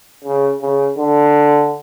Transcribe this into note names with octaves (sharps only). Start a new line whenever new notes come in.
C#3
C#3
D3